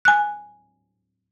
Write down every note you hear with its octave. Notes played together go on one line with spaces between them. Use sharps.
G#5 F#6